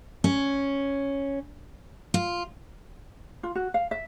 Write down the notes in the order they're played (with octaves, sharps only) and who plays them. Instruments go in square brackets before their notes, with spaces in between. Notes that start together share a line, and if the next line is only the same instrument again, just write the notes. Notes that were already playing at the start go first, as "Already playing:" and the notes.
[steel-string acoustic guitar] C#4
F4
[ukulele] F4
F#4
F5
E5